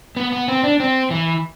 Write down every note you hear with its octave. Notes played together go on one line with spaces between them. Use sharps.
B3
B3
C4
D4
C4
E3